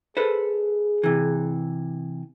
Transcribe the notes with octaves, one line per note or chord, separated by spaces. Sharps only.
G#4 A4 B4 C5
C3 E3